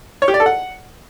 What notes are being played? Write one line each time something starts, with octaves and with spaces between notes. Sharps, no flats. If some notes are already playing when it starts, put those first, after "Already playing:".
C#5
G4
D5
A4
F#5